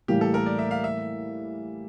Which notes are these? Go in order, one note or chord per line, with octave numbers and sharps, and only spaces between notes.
A2 E3 G3 A#3 G4
A4
A#4
D5
E5
F5
E5